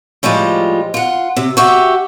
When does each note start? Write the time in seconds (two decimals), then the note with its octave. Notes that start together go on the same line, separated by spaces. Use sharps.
0.23 A2 F3 G3 G#3 F4
0.94 F4 F#5
1.36 C3
1.57 F#4 G4 E5